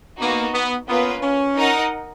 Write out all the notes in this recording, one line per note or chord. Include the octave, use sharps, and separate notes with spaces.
A#3 B3 D#4 F#4
B3
A#3 B3 C#4 F4 B4
C#4
D#4 A#4 D#5 F#5